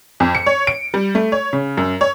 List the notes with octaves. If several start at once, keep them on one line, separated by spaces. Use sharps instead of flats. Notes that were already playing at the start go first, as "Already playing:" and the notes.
F2
C#7
C#5
D7
G3
A3
C#5
C#3
F#2
C#5